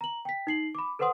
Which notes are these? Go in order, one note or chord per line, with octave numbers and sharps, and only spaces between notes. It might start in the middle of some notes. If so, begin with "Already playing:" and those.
A#5 F#7
G5 B6
D#4 C7 F#7
B5 D6
A4 B4 C5 F#5 C6 D#6